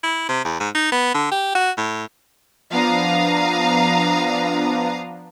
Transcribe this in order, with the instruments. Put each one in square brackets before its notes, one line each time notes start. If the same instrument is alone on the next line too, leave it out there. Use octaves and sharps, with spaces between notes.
[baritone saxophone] E4
C3
E2
G#2
D#4
B3
D3
G4
F#4
A2
[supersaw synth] F3 B3 D4 [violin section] F5 A#5 D#6